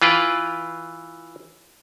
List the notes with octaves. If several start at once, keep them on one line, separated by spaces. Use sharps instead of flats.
E3 F4 B4 G5